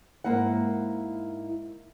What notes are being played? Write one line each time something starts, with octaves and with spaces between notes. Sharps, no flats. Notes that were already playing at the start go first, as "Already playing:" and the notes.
G#2 A#3 E4 F#5